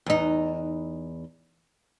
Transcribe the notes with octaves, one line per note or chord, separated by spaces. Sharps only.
E2 D#4